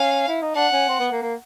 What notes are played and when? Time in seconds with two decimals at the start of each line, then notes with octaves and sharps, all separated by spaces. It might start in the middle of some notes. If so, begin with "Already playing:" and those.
Already playing: C#4 F5
0.28 E4
0.42 D#4
0.55 D4 F#5
0.72 C#4
0.89 C4
1.00 B3
1.11 A#3
1.22 A#3